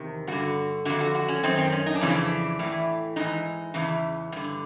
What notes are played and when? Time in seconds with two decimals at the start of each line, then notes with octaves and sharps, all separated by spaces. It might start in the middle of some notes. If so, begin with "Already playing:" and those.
Already playing: E2 C3 D#3
0.27 G2 D3 F#4
0.85 F2 D3 F#4
1.00 F#4
1.15 F#4
1.29 C#4
1.43 F#2 D#3 C4
1.58 C4
1.72 C#4
1.86 D#4
1.95 D4
2.01 F2 C#3 E3 C#4
2.10 D4
2.59 A2 E3
3.16 G#2 E3 D#4
3.74 E2 C#3 E3
4.32 G2 D3